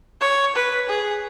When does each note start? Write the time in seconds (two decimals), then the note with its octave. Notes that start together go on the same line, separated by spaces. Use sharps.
0.21 C#5
0.55 B4
0.89 G#4